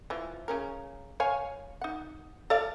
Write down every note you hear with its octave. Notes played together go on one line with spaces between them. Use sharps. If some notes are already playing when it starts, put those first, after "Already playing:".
E3 F3
C#3 C#4 A#4
C#5 F5 G#5
D#4 F#5
A4 D5 F5